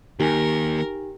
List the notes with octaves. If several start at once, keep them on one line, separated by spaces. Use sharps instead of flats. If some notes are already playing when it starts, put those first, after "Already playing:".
D#2 D#4 G4 A#4 G#5